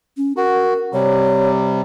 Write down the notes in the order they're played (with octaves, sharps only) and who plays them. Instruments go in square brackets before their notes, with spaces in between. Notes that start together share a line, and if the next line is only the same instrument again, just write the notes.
[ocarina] C#4
[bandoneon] F#4 [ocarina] A#4
[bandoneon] C3 G3 [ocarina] C#5